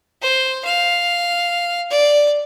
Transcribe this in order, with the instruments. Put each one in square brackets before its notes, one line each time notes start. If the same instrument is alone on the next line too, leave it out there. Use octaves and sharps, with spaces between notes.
[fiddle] C5
F5
D5